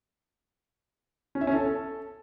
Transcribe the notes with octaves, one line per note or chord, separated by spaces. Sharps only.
C#4
E5
C#4
A4